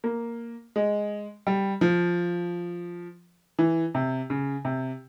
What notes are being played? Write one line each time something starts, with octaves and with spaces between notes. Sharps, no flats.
A#3
G#3
G3
F3
E3
C3
C#3
C3